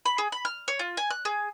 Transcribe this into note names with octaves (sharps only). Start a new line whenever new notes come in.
B5
G#4
B5
F6
C#5
F4
G#5
F#6
G#4